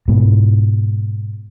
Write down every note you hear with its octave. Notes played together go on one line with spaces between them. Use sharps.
G#2 B2